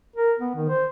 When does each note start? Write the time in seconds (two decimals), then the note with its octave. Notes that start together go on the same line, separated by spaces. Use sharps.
0.16 A#4
0.39 B3
0.55 D#3
0.69 C5